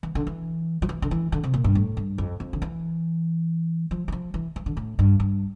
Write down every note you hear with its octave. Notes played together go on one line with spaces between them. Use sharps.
E3
D3
E3
F3
E3
D3
E3
D3
C3
A#2
G2
A2
G2
F2
F2
D3
E3
F3
E3
F3
E3
E3
D3
A2
G2
G2